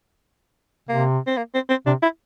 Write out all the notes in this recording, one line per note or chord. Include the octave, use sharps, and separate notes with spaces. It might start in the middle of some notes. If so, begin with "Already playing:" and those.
C3 A#3
C4
A#3
C4
C4
C3 D4
E4